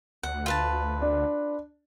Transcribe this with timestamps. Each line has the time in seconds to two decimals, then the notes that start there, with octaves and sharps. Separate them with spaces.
0.23 D2 F#5
0.46 F4 B4 A5
1.02 D4